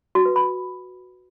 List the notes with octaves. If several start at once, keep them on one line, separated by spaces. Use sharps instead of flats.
F#4
B4
B5